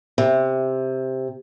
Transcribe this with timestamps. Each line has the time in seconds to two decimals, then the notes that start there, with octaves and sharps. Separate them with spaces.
0.18 C3